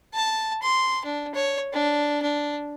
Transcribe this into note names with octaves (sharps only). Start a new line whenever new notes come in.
A5
C6
D4
C#5
D4
D4